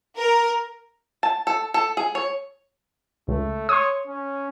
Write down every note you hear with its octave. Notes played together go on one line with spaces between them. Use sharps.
A#4
A5
A4
A4
G#4
C#5
C#2 A3
C#5 C6 D#6
C#4